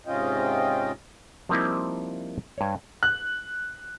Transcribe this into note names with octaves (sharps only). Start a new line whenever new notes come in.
G#2 C3 C#4 F4 D#5 G5
F3 G3 A#3 C4 D#4 E4
G2 C#5
F#6